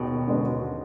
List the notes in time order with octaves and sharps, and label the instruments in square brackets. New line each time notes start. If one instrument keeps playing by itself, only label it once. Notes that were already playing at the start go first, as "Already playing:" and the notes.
Already playing: [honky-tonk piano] D#2 G#3 [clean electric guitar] B2
[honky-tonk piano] D3 G#3 B3 D4